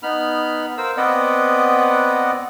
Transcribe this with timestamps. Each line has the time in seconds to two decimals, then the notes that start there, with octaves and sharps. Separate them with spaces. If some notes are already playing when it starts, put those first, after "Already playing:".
0.03 B3 D#4 B5 F6
0.78 A#4 C5 F5 E6
0.97 B3 C4 B4 D5 D#5 F#5